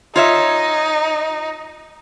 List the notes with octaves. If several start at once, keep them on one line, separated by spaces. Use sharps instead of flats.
D#4 F4 C#5 E5